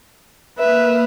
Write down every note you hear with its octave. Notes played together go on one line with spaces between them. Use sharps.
A#3 B4 E5 D#6 F6